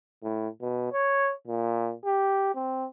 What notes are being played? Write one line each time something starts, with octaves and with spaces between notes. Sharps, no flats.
A2
B2
C#5
A#2
G4
C4